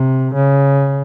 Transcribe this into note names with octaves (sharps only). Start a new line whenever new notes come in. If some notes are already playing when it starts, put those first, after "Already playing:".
Already playing: C3
C#3